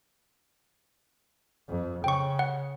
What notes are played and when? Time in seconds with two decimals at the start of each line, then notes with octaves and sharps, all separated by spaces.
1.68 F2
2.04 C#3 G5 C#6
2.39 F#5